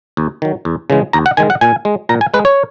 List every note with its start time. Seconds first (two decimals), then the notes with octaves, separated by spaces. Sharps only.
0.17 D#2
0.42 D#3 F#3
0.65 E2
0.90 C#3 E3 G#3
1.13 D#2 A#5
1.26 F#5
1.37 D#3 G#3 G#5
1.50 F#5
1.61 A#2 G#5
1.85 G#3
2.09 A#2 A#5
2.21 G#5
2.34 G#3 B4
2.45 C#5